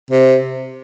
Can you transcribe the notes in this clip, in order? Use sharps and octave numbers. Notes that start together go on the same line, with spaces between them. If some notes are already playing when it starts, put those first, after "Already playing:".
C3